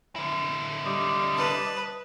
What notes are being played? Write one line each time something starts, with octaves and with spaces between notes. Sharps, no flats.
D3 E4
G3 D#5
B4 A5